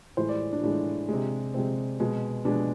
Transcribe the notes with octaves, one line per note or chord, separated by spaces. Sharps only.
A2 E3 G#3 C5
D5
D4
A2 E3 G#3 D4
C3 G#3
C3 G#3 C4
B2 G#3
B2 G#3 D4